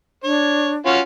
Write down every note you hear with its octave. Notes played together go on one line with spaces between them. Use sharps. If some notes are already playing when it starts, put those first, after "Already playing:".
D4 C#5
C#4 F4 F#4